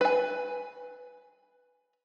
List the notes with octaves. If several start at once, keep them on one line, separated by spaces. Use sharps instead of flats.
B4 G#5